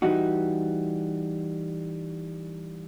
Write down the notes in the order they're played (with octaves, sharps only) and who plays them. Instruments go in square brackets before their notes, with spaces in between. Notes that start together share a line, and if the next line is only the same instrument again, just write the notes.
[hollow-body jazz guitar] E3 G3 D#4 F#4